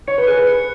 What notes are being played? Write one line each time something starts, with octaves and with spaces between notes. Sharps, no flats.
C#5 C#7
B4
G#4 F#6
B4
C#7